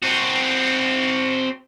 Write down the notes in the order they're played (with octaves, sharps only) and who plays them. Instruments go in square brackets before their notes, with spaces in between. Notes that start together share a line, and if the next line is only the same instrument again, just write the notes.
[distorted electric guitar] C4 F#4